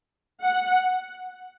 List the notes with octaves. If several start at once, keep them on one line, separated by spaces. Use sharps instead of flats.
F#5